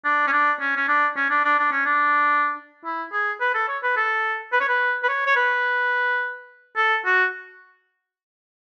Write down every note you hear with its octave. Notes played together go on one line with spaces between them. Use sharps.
D4
C#4
D4
C#4
C#4
D4
C#4
D4
D4
D4
C#4
D4
E4
G#4
B4
A4
C#5
B4
A4
B4
C#5
B4
B4
C#5
C#5
B4
A4
F#4